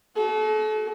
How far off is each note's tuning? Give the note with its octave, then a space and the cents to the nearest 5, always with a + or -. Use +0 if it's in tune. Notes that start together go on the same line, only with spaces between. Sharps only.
F#4 +35 A4 -35